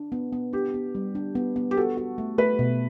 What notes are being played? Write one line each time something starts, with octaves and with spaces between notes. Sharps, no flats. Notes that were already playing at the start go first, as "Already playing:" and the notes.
Already playing: D4
B3
B3
D4 G4
B3
G3
D4
B3
B3
G4
F#4 A4
F#4
A3
A3 B4
B2